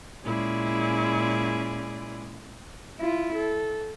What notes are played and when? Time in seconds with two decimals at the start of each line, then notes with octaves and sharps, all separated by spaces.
0.24 A#2 G#3 C#4 E4 G#4 D5
3.00 E4 F4
3.36 A4